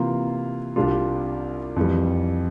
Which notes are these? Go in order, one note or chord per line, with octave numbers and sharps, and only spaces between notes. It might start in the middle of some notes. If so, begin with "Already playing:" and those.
Already playing: C3 E3 A#3 F4
C2 C3 G3 D4 F4
F2 E3 G3